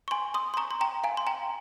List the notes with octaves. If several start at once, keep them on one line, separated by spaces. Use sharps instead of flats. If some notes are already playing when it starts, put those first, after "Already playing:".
C#6
G#5 C6
C6 D#6
C6
A#5 C#6
C6
G5 A#5
F5 G#5
C6
G5 A#5